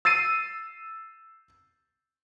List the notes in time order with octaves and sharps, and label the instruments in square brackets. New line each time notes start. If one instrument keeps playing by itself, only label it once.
[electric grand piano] E6 A6 C7 D#7